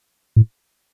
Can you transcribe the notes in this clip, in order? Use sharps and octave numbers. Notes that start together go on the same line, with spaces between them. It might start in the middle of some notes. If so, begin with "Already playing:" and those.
A2